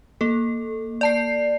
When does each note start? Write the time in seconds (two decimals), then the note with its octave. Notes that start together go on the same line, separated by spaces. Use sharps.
0.21 A#3 A4
1.01 D5 A5 C7